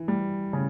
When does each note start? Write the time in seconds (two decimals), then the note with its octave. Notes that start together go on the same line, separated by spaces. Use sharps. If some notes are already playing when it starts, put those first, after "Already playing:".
Already playing: E3
0.08 G3
0.53 C#3